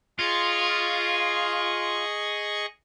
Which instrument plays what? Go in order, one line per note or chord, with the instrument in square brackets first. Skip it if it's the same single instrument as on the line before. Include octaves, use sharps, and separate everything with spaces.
[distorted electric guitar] F4 [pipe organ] G#4 D#5 C#6